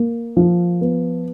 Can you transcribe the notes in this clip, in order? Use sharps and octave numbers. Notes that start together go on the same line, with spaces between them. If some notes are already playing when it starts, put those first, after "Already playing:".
Already playing: A#3
F3
B3